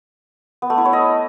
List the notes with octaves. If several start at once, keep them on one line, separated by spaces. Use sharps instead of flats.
B3
A3
E4
C#5
D#5